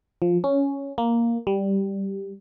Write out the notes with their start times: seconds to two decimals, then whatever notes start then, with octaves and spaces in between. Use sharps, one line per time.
0.22 F3
0.44 C#4
0.98 A#3
1.47 G3